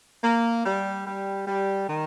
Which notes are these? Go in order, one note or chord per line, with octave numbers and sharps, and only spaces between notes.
A#3
G3
G3
G3
D#3